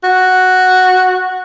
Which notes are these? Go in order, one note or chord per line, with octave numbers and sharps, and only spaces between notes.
F#4